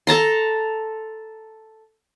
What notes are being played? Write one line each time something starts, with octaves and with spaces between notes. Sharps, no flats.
A4 A5 A#5 C6